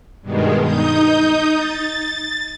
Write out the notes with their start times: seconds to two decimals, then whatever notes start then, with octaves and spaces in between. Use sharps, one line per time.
0.22 G2 B2 D#3 G#3
0.61 D#4 D#6 G6
1.54 A6